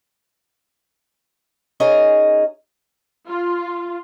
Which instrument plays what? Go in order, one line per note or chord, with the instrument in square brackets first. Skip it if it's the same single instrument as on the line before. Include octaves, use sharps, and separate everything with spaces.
[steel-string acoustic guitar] C#4 D#4 G#4 A#4 D#5
[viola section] F4